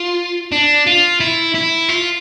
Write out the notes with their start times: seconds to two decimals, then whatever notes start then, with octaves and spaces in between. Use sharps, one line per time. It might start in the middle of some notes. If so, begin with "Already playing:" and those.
Already playing: F4
0.52 D4
0.87 F4
1.20 E4
1.55 E4
1.89 F4